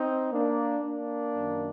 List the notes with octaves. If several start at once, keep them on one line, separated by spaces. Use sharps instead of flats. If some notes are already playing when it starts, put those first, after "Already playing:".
Already playing: C4 D#4
A#3 D4
A#3 D4
F#2 D#3